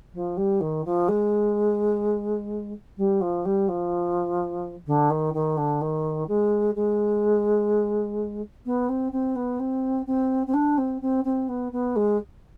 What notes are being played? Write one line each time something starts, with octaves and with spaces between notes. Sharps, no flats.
F3
G3
D#3
F3
G#3
G3
F3
G3
F3
D3
D#3
D#3
D3
D#3
G#3
G#3
B3
C4
C4
B3
C4
C4
C4
D4
C4
C4
C4
B3
B3
G#3